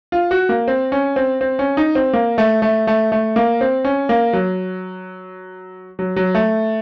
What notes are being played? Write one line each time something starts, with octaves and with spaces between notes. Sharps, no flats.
F4
F#4
A#3
C4
C#4
C4
C4
C#4
D#4
C4
A#3
A3
A3
A3
A3
A#3
C4
C#4
A#3
F#3
F#3
F#3
A3